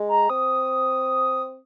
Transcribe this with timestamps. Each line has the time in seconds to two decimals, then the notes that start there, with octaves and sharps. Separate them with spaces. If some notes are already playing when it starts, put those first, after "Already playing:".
Already playing: G#3
0.09 A#5
0.30 C4 D#6